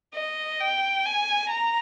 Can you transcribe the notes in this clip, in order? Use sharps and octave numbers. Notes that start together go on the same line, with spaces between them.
D#5
G5
G#5
A#5